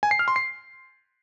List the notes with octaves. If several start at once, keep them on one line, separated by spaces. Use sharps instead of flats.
G#5
C7
F6
C6
C7